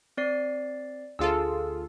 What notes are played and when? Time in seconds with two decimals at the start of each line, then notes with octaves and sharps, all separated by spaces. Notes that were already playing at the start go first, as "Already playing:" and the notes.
0.17 C4 D5 C7
1.19 D2 F4 G#4 A4 E6